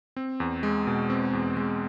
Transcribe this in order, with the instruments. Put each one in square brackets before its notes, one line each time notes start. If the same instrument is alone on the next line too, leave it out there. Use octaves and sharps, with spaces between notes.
[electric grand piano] C4
E2
G#3
B2
C4
E2
G#3